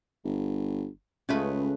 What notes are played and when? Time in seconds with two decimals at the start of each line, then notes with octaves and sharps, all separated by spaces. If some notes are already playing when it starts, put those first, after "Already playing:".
0.24 G1
1.29 C#2 C#3 A3 B4